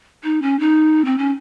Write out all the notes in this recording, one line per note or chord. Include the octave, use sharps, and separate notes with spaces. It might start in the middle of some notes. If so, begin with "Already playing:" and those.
D#4
C#4
D#4
C4
C#4